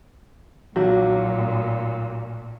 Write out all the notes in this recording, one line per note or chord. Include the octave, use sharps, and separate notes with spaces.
B1 A#2 F#4